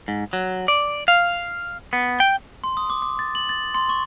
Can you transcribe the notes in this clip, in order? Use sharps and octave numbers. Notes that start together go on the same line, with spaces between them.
G#2
F#3
D5
F5
B3
G5
C6
D#6
D6
D6
A6
F#7
A6
C6
C#6